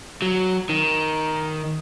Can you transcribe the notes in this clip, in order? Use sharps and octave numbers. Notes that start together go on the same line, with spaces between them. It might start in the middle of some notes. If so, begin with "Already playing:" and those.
F#3
D#3